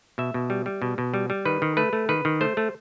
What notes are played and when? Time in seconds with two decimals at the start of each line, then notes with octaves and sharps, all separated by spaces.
0.18 B2 E5
0.34 B2
0.50 G3
0.66 G3
0.82 B2
0.98 B2
1.14 G3
1.30 G3
1.45 D#3 B4
1.62 D#3
1.77 A3 B4
1.93 A3
2.09 D#3 B4
2.25 D#3
2.41 A3 C5
2.57 A3